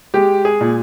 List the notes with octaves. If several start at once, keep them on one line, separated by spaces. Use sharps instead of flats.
G#3 G4
G#4
A#2